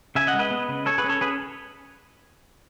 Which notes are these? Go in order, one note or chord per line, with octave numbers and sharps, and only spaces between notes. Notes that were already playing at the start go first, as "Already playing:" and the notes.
C#3 E5 G#5
D#5 F#5
G#3
B4 D#5
B3
C#3
C#4 A4 C#5
G#4 B4
C#4
A4 C#5
C#4 G#4 B4